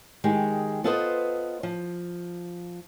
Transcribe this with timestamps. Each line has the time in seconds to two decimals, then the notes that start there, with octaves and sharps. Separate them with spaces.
0.24 D#3 G#3 G4
0.84 B3 F4 A4 B4 C5 D#5
1.63 F3